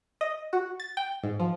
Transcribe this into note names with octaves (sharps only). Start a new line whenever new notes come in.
D#5
F#4
A6
G5
G#2
F3